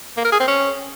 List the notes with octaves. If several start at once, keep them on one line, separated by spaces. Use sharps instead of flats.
A#3
A#4
G#4
C4
C#4